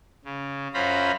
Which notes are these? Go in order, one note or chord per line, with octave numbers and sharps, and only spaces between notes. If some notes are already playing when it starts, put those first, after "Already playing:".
C#3
F#2 C#4 F4 C5 A#5 B5